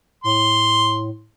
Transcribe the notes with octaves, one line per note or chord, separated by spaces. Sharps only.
A2 C6